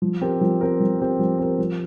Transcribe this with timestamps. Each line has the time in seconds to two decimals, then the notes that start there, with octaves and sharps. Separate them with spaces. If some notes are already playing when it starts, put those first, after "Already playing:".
0.02 F3
0.21 C4 G4 A#4
0.41 F3
0.61 C4 G4 A#4
0.80 F3
0.99 C4 G4 A#4
1.19 F3
1.39 C4 G4 A#4
1.59 F3